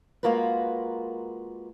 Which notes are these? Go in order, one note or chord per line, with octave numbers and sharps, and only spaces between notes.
G#3 A#3 F4 F#4 A#4 B4